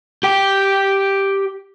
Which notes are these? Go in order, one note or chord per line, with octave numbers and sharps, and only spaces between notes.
G4 G5